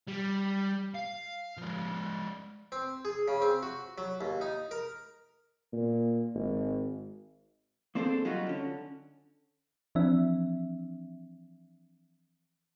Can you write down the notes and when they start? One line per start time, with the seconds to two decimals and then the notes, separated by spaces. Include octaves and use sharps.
0.07 G3
0.94 F5
1.58 F3 G#3
2.72 C4
3.05 G#4
3.28 C#3
3.42 C4
3.63 F#4
3.98 F#3
4.21 D#2
4.41 D#4
4.71 A#4
5.73 A#2
6.34 G#1
7.95 A#3 C4 D4 G#4 A4 C5
8.25 F#3 G3 D#4 F4 F#4
8.47 D3 C#4
9.95 E3 F3 C4 D4 E5